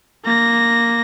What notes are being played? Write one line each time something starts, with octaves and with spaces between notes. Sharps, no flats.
A#3 A#6